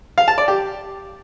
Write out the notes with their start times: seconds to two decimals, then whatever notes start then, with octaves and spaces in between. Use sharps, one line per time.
0.18 F5
0.28 A5
0.38 D5
0.48 G4